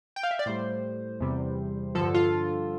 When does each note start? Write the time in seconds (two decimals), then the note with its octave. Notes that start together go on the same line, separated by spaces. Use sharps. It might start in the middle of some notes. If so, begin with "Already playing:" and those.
0.16 G5
0.23 F5
0.31 E5
0.39 D5
0.46 A2 G3 C5
1.20 E2 C3 G3
1.95 G2 D3 F3 A4
2.15 F4